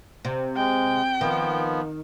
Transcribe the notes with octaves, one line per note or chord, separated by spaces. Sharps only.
C3
G#3 G5
D#3 F3 B3